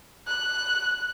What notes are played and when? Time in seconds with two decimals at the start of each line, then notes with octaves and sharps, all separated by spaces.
0.27 F#6